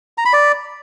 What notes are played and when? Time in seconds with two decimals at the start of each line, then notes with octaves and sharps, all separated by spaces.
0.18 A#5
0.25 B5
0.33 D5